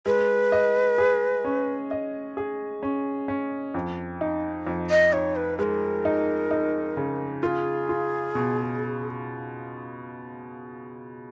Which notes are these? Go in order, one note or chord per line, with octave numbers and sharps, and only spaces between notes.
G#3 B4
D#5
G#4
C#4
D#5
G#4
C#4
C#4
F2
D#4
F2
D#5
D#4 C#5
B4
G#3 A#4 B4
D#4
D#4
C#3
F4 G#4 A#4
F4
B2